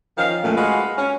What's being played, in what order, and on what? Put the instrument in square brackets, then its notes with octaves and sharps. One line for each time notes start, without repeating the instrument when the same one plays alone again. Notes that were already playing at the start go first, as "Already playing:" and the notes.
[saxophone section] D#3 F3 C#4 F5
F#2 A#2 A3
G#3 F#4 B4 F5
C#4